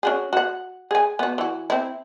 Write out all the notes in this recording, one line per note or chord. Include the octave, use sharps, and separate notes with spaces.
C#4 F#4 G#4
F#4 F#5
G#4 G#5
B3 F#4
E3 F#4
C4 E4